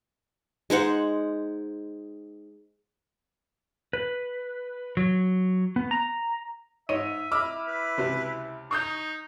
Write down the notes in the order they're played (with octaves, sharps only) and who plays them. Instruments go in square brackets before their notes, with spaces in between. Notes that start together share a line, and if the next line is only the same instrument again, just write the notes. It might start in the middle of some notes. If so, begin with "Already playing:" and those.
[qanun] G#3 D#4 C5 F#5
[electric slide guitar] B4
F#3
B3
A#5
[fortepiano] G#2 C#5 D#5 [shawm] E5 [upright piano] D#7
[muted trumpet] E4 [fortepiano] D#5 B5 [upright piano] D6 E6 F6
[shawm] B4
[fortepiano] C#2 C3 F#4
[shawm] D#4 [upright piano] C#6 D#6 G6